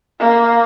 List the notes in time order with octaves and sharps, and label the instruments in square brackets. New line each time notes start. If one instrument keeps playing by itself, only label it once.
[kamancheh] A#3